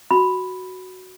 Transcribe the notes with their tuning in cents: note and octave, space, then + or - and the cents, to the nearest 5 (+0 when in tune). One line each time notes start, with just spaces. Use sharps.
F#4 +0 B5 +0